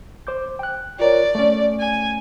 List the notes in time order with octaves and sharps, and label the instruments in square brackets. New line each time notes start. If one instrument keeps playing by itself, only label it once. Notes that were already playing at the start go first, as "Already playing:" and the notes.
[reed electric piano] C5 D6 G6
G5 F#6
[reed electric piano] F4 A#4 C#5 [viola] D5
[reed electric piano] A3 C#4
[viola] G#5